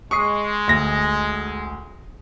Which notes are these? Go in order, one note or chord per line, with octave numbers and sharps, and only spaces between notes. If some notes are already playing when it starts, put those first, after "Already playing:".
G#3 C#6 D#6 C7
D2 A#6